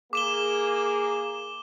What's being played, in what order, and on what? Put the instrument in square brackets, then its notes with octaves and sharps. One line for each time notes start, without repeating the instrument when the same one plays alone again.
[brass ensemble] A#3 G#4 [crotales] D6 E7 G7